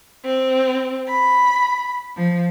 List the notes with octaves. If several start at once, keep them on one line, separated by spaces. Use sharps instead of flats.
C4
B5
F3